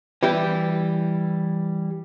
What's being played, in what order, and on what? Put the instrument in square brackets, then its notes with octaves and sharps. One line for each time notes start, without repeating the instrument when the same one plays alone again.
[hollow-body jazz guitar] E3 G3 E4 G4